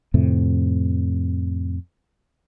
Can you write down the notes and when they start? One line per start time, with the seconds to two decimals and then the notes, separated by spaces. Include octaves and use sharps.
0.14 F2 A2 C3